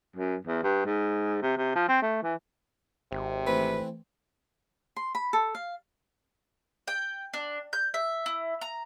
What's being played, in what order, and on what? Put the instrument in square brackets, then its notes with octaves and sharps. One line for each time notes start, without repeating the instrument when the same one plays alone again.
[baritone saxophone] F#2
E2
G2
G#2
C3
C3
F3
C4
A3
E3
[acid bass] G#1 [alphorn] C3
[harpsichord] E3 A3 C4 [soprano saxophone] B4
[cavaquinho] C6
B5
A4
F5
[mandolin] G5
D4
G6
E5
E4
A#5